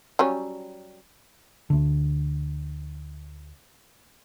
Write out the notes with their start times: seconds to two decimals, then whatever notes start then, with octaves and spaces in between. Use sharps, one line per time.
0.19 F#3 G3 C#4
1.70 D2 D3